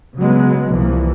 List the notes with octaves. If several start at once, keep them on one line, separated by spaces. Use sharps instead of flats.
C#3 F#3 G#3 B3
C2 E3 F3 A#3